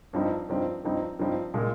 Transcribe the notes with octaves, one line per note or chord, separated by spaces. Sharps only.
G2 F3 C4 D#4
G2 F3 C4 D#4
G2 F3 C4 D#4
G2 F3 C4 D#4
A#2 G#3